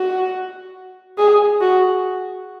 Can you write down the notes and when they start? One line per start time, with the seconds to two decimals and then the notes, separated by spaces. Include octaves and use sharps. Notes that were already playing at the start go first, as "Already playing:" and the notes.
Already playing: F#4
1.18 G#4
1.60 F#4